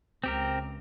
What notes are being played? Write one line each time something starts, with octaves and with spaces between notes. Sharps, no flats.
C#2 C4 G4 A#4